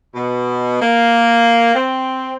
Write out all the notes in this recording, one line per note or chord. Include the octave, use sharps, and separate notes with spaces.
B2
A#3
C4